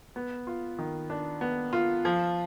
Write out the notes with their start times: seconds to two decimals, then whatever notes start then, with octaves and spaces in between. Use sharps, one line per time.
0.16 B3
0.47 F4
0.79 D#3
1.10 D4
1.41 B3
1.73 F4
2.05 F3